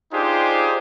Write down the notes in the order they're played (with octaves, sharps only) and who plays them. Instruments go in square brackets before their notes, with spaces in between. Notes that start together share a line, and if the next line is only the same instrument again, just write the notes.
[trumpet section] D4 D#4 F4 G4 G#4 C5